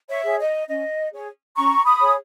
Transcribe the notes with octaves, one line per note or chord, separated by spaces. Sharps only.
C#5 E5
G#4 C#5
D#5
C#4 D#5
G#4 C#5
C#4 A#5 C#6
B5 D#6
G#4 C#5